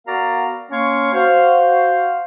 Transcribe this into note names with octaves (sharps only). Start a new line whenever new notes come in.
B3 F#4 A#4 D5 F5 A#5
A#3 C#4 C#5 F5 C6 C#6
F#4 C5 F5